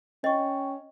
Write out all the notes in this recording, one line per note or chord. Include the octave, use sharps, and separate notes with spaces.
C#4 D#5 G5 C#6